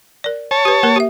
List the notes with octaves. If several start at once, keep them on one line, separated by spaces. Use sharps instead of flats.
A#4 D5
C#5 A5
G4 B4
A#3 A#4
G4 E5